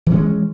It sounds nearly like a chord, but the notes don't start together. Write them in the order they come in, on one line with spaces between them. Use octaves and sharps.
E3 F#3 C#4 G#3